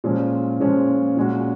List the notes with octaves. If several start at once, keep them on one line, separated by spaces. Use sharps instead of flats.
A#2 F3 G#3 C#4
A#2 F3 G#3 C#4
A#2 G#3 C#4 F#4